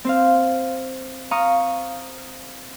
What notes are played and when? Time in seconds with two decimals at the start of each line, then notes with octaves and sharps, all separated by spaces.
0.05 C4 C5 F5
1.31 F5 A#5 C#6 D#6 F6